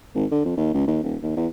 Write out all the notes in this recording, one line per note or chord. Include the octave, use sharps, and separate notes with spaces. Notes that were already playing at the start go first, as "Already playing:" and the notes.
G#1
D3
F2
D#2
C#2
D#2
D#1
D#2
E2